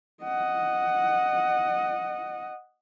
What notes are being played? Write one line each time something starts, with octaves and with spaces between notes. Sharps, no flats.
D#5 F#5